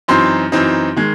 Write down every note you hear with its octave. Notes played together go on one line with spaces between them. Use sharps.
F#2 E3 C4 D#4 C6
F#2 E3 C4 D#4
D#3 G#3